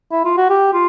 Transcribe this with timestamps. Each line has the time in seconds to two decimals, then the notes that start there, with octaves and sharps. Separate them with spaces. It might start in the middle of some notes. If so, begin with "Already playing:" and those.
0.12 E4
0.25 F4
0.37 F#4
0.50 G4
0.73 F4